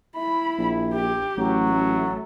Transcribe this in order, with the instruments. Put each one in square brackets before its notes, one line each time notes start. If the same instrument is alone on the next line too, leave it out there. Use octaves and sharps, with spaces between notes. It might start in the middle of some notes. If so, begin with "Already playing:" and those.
[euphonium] E4 [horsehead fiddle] B5
[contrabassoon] A#1
[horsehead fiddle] G4
[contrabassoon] A1 [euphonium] F#3
[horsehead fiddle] A3 C#4